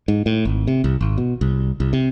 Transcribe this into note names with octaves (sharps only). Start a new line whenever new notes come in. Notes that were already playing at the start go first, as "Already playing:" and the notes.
G#2
A2
G#1
C3
C2
G#1
B2
C2
C2
C3